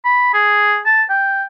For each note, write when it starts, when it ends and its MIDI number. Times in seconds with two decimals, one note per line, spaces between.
0.05 0.31 83
0.34 0.79 68
0.86 1.03 81
1.10 1.44 79